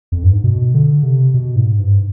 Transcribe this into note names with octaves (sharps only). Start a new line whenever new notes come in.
F2
G2
G#2
B2
D3
C3
B2
G#2
G2